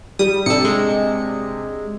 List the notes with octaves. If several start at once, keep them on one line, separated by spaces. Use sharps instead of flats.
G3 D#6
C3 D4 A4 C#7
G#3